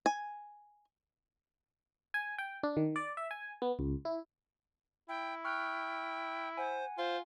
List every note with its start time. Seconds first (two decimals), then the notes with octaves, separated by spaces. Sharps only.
0.06 G#5
2.14 G#5
2.38 G5
2.63 D4
2.77 D#3
2.96 D5
3.17 E5
3.31 G#5
3.62 B3
3.79 C#2
4.05 E4
5.09 E4 G5
5.45 G5 C#6 F6 F#6
6.57 C5 F#5 G#5
6.98 F4 C5